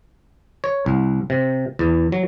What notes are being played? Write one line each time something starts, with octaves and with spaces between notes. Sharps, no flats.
C#5
C2
C3
E2
F#3